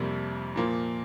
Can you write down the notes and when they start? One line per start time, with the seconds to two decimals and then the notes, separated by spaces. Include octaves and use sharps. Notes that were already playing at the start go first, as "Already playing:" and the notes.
Already playing: F1 F2 C3 G3 A#3
0.56 A#2 F3 A#3